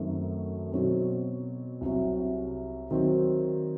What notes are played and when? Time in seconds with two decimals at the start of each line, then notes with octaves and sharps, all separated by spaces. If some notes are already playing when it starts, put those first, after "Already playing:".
Already playing: F#2 D#3 A3 C4
0.72 B2 F#3 C4
1.81 C2 C3 F#3
2.91 D#3 F#3 C4 F#4